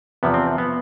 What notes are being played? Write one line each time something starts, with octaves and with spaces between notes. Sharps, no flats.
E2 C3 F3 B3
C4
B3